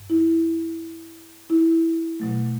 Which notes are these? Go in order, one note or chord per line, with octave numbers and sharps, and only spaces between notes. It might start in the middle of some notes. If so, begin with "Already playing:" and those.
Already playing: G2
E4
E4
B2 F#3 A3